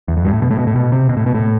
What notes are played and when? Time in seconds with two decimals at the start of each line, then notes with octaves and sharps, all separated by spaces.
0.08 E2
0.17 F2
0.25 G2
0.33 A2
0.42 B2
0.51 A2
0.59 B2
0.67 A2
0.76 B2
0.92 C3
1.09 B2
1.17 A2
1.26 B2
1.35 A2